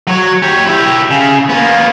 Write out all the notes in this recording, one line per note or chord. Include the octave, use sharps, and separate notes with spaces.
F#3 C#5
G4 C#5
E4 G4
C#3
A#3 B3